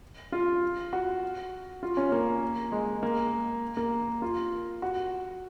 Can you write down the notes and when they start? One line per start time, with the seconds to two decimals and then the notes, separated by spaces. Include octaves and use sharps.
0.32 F4
0.93 F#4
1.83 F4
1.97 C#4
2.12 A#3
2.72 G#3
3.03 A#3
3.77 A#3
4.22 F4
4.82 F#4